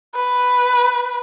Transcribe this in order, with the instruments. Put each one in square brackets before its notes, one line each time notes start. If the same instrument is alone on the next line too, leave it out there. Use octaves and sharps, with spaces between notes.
[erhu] B4